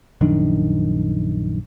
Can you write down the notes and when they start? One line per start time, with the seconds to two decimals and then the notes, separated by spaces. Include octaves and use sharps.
0.21 A#1 F#2 D#3 D4